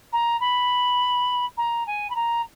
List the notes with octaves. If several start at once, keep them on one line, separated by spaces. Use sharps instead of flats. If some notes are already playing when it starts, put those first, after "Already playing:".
A#5
B5
A#5
G#5
B5
A#5